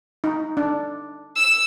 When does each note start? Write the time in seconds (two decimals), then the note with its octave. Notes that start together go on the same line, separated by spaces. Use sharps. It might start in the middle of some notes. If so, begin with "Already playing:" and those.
0.24 D#4
0.57 D4
1.36 E6 E7